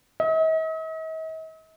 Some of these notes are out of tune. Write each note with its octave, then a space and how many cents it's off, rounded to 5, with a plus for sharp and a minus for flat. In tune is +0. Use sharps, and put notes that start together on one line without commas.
D#5 +45